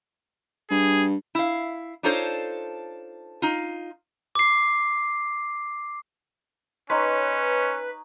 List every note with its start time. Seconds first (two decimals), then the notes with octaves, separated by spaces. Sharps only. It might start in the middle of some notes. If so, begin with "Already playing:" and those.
0.71 G2 G#4
1.35 E4 F5
2.03 D4 D#4 F4 A4 C5 C#5
3.42 D#4 F4
4.35 D6 C7
6.90 C#4 D#4 B4 C#5 D#5 C6